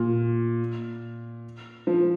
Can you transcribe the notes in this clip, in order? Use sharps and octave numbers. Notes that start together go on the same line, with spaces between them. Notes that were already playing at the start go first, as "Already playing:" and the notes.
Already playing: A#2
F3